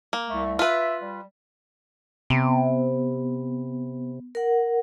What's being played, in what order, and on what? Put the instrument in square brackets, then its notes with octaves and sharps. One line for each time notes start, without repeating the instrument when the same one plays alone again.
[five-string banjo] A#3
[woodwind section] C2 A3
[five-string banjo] F4 B4 [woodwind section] E5
[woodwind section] G3
[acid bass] C3 [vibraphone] B3
[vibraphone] A#4 F#5